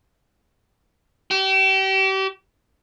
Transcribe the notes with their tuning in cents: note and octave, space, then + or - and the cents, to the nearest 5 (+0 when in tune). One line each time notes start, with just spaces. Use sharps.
G4 -35